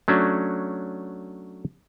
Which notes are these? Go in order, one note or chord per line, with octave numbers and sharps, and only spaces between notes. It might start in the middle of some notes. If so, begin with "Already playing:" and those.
F#3 A3 C#4 D4 F#4